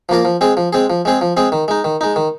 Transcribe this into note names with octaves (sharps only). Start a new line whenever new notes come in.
F3 A#3 F4 A#4
F3
G#3 C4 G#4
F3
G#3 C4 G#4
F3
G#3 C4 G#4
F3
G#3 C4 G#4
D#3
G#3 D#4
D#3
G#3 D#4
D#3